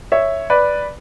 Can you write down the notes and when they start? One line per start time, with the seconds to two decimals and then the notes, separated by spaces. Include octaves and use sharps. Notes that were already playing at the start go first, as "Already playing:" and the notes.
0.12 C#5 E5
0.50 B4 D5